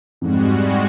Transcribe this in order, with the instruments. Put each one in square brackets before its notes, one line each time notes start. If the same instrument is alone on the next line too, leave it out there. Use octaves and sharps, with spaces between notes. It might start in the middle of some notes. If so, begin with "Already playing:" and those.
[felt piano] F2 G#2 [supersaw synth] G3 G#3 F#4